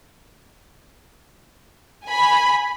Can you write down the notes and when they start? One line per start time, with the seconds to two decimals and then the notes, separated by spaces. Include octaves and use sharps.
2.05 G#5 B5